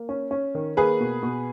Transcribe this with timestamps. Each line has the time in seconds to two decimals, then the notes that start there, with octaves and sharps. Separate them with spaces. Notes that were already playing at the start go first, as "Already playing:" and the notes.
Already playing: A#3
0.09 C#4
0.31 C#4
0.55 D#3
0.77 A#3 G#4 B4
1.00 B2
1.23 B2